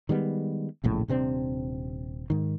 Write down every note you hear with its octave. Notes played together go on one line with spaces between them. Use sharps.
D#3 G3 G#3 B3
E1 A#1 A2 C#3
D#1 C3 C4 D4
G#2 D#3